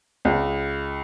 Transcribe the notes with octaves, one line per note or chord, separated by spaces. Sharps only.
C#2